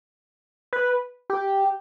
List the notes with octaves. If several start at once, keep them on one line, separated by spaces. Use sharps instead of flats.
B4
G4